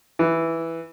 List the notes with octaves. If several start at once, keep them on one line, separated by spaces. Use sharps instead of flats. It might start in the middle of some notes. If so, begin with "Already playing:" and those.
E3